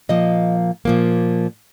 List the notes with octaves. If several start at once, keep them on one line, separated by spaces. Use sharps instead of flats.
A#2 F3 A#3 D#5
A#2 F3 A#3